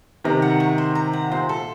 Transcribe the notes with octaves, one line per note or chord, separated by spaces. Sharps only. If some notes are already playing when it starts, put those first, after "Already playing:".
C3 D#3 A#5
F#5
C#6
C5
A#5
F#5
A#2 C5
A4